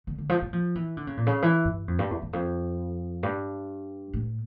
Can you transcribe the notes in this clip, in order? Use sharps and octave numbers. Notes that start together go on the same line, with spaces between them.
D3
D3
F3
G3
F3
E3
D3
C#3
A#2
C#3
E3
G2
F2
G2
E2
E2
F2
G2
A2